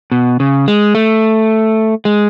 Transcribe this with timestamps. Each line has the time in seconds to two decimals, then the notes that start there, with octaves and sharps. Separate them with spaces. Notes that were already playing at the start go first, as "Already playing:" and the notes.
0.12 B2
0.40 C#3
0.68 G#3
0.95 A3
2.05 G#3